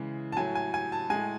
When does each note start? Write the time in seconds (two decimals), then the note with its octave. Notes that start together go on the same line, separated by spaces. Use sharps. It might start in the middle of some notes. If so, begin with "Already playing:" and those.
Already playing: C#3 E3 G#3
0.32 A5
0.36 A2 F#3 G#5
0.55 G#5
0.74 G#5
0.92 A5
1.10 A2 G#3 G#5